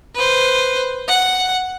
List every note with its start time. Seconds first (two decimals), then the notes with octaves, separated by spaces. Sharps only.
0.15 B4 C5
1.08 F#5